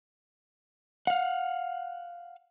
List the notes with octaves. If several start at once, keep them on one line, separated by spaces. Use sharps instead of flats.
F5 F#5